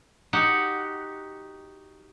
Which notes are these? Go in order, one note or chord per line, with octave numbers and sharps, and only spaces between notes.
D#4 F#4 G4 F#5